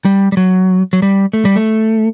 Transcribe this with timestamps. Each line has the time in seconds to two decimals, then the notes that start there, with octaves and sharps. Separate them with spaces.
0.05 G3
0.32 G3
0.37 F#3
0.93 F#3
1.02 G3
1.33 A3
1.45 G3
1.56 A3